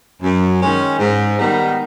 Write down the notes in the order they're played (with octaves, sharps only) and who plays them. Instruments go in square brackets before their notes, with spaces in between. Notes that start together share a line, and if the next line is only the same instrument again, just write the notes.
[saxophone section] F#2
D#3 G#3 C#4
G#2
D#3 G3 B3 D#4